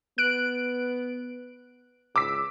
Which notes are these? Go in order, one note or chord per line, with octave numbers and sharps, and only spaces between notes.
B3 F#6 D7
C#2 D6 E6 B6